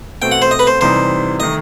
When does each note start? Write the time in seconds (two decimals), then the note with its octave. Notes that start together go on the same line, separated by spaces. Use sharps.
0.22 B2 A3 C4 G5
0.32 F#5
0.42 C5
0.51 D#5
0.59 B4
0.67 C5
0.81 C3 E3 G3 D#4 C5
1.40 D#3 A3 D#5